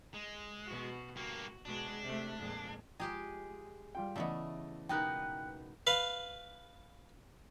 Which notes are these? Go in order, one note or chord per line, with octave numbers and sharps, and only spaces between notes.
G#3
B2 F#4
G2 A#3 F#4
B2 G#3 D4 F#4
C3 A3
F2 A#2 G#3
F3 G#3 G4 G#4 D#5 G5 A#5
G3 F4 G5
C#3 E3 A3 B3 D5 D#5
B2 G#3 D#4 G4 A#4 B4 G5 F#6
B4 F5